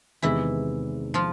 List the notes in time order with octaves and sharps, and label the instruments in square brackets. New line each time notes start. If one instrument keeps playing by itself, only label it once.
[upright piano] E2 C3 D#3 G#3 [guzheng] E3 E4
[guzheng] F3 F4